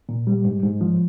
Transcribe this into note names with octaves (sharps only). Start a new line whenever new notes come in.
A#2
G3
G#2
G#2
F3